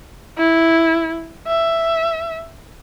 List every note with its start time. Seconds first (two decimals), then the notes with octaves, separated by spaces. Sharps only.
0.38 E4
1.48 E5